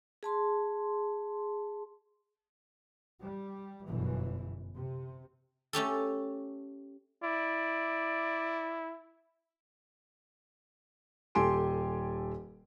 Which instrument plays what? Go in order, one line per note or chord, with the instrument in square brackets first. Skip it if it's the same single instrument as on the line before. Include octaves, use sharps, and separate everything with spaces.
[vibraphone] G#4 A5 C6
[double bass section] G3
G1 F#2 B2 E3
C3
[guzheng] A3 C#4 G4 A4
[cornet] E4 [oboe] D5
[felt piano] D#1 G4 A4 G#5 C6 D7